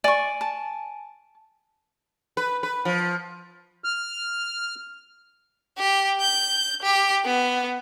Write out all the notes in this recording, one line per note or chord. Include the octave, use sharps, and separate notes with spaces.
D5 G#5 C#6 D7 D#7
A5
B4
B4
F3
F6
G4
G6
G4
B3